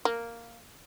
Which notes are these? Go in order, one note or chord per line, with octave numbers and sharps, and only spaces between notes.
A#3